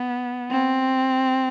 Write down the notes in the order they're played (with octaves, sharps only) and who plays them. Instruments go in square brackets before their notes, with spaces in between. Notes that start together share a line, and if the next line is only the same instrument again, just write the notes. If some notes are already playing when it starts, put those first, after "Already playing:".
Already playing: [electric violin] B3
C4